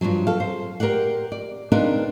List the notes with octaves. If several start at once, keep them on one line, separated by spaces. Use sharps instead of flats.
G2 B2 F3 F#3
A4 F5
C5
G4 A#4 C5 D5 F#5
D5
C4 D4 D#4 A#4 B4 F5